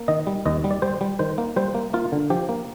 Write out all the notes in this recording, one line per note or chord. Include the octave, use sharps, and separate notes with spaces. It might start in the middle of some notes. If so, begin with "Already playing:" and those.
Already playing: A#3
D#3 D#5
G3
D#2 D#5
G3
D5
G3 C5
G3
D#3 C5
A#3
G3 C5
A#3
A#3 F4
D3
F3 G4
A#3